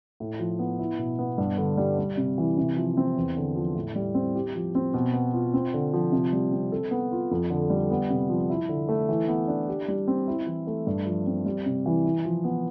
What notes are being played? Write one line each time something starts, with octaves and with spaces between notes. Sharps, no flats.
A2
F3
B3
E4
B2
B3
G2
D3
G3
G3
C3
E3
C3
F3
C4
E2
D3
F3
A2
G3
C4
G4
F3
C4
B2
B3
F4
C4
D3
F3
C3
G3
C4
A4
B3
F4
F2
D3
G3
B3
C3
F3
E4
D3
A3
E3
B3
D4
G4
G3
C4
E4
E3
A3
G2
F3
C4
G3
C3
E3
E4
F3
B3